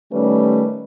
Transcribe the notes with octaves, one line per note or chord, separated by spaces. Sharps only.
D#3 G3 A3 C#4 B4